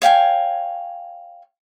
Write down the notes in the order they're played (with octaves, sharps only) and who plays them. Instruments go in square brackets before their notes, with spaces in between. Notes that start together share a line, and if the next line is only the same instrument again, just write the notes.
[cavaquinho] C#5 F5 G5 G#5